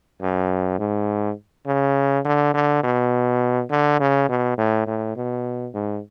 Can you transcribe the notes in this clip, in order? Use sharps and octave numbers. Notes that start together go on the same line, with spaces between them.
F#2
G#2
C#3
D3
D3
B2
D3
C#3
B2
A2
A2
B2
G#2